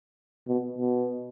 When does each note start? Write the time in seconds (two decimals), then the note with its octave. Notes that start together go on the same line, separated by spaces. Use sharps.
0.47 B2
0.78 B2